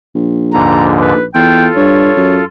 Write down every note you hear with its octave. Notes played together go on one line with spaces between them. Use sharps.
A#1
D#2 G#2 D3 A#5
B4
E2 F4 A4 G5
G2 C#5
F#2